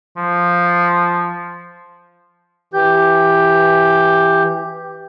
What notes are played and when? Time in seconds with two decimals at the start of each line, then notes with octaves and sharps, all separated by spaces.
0.17 F3
2.73 E3 G4 G6